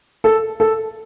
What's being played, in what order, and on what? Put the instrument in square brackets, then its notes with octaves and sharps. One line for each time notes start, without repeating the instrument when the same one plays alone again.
[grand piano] A4
A4